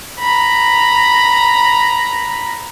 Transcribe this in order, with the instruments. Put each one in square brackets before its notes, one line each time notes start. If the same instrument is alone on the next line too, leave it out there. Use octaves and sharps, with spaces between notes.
[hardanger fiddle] A#5 B5